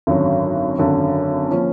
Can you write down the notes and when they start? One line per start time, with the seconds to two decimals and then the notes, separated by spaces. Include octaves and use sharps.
0.07 G#1 F#2 D3 F#3
0.78 G#1 F#2 D3 F#3
1.51 F3 A#3 C#4